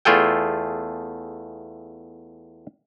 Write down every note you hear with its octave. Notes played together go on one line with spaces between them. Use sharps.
E2 A3 F4 G#4 A4 G5